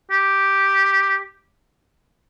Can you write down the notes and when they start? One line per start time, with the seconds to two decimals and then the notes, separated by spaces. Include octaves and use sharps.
0.11 G4